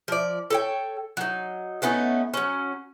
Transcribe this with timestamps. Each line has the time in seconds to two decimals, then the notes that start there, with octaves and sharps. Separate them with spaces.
0.08 F3 D5
0.50 A4 C#5 G5
1.17 F#3 D#4
1.82 A3 B3 C#4 D#4
2.34 F#3 C#4